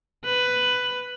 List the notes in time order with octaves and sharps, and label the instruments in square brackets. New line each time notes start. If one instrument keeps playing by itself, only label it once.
[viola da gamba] B4